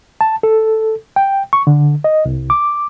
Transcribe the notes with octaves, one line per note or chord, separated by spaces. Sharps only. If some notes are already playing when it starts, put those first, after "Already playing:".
A5
A4
G5
C#6
D3
D#5
C2
D6